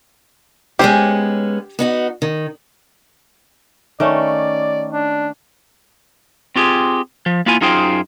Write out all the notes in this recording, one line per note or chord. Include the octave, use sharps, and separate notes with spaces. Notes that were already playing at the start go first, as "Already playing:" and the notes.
G#3 B3 C#4 G4 C5
B3 D#4 F#4
D#3
D#3 A3 C#4 D5
D4
C4 F4 G4 G#4
F3
A#3 B3 E4 F4 G#5
F#2 D#4 F4 G#4 C5 G5